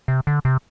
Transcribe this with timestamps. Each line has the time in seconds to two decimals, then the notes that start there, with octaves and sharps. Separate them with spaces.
0.08 C3
0.27 D3
0.45 C3